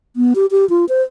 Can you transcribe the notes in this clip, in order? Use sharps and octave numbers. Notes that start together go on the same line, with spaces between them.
B3
G4
G4
F4
C5